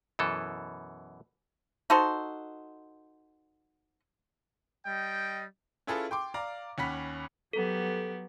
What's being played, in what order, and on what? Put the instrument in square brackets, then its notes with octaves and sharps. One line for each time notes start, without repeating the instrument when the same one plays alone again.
[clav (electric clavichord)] F#2 B2 E3 A4
[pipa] D#4 F#4 A4 C5
[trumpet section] G3 D#5 G5
[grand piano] C#4 E4 F4 G#4 A4 B4
G5 C6 D6
D5 F5 A#5 D6
D#2 C#4 F#5 B5 B6
[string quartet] F#3 B3 G4 [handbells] A4